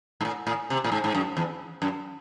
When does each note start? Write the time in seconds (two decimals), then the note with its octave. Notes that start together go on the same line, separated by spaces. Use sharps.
0.21 G#2
0.25 A2
0.47 A2
0.70 C3
0.84 A2
0.92 G#2
1.04 G#2
1.15 F#2
1.37 E2
1.82 F#2